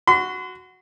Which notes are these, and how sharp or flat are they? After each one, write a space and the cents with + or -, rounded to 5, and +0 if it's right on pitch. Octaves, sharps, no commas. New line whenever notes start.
F#4 +0 C6 -40